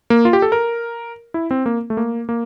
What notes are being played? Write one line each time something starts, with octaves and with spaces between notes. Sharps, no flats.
A#3
F4
G4
A4
A#4
E4
C4
A#3
A3
A#3
A#3